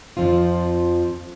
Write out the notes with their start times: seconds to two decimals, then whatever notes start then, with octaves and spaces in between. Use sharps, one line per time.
0.17 F2 F3 C4 F4